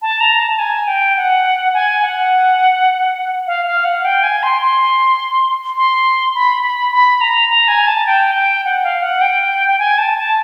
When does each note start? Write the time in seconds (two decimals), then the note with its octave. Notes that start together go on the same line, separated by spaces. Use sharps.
0.02 A5
0.21 A#5
0.40 A5
0.59 G#5
0.88 G5
1.17 F#5
1.74 G#5
2.03 F#5
3.47 F5
3.66 F5
3.85 F#5
4.05 G5
4.23 G#5
4.43 C6
4.62 C6
5.77 C6
6.35 B5
6.63 B5
6.92 B5
7.21 A#5
7.49 A#5
7.68 G#5
7.87 A5
8.07 G5
8.36 G5
8.65 F#5
8.84 F5
9.03 F#5
9.21 G5
9.69 G5
9.79 G#5
9.98 A5
10.18 A5